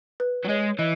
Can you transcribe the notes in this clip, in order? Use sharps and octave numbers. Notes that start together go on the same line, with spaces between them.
B4
F#3
G#3 C#5
E3 D#5